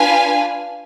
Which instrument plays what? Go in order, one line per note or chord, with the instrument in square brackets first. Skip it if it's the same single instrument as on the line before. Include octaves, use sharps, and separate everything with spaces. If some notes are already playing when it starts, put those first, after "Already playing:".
Already playing: [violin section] D4 F4 B4 F5 G#5